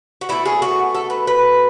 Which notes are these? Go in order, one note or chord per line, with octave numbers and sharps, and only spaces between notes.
F#4
B2 A3 E4
G#4
F#4
A4
B4
B4